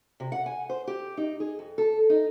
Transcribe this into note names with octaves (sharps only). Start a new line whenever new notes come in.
C3
F#5
G#5
C5
G4
D#4
G#4
F2
A4
D#4